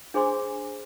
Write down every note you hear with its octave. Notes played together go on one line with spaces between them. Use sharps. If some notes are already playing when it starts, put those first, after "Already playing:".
D4 G#4 C5 G#5 C6 D6